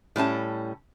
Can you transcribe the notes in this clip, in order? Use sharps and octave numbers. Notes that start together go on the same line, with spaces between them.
A2 G3 C#4 A5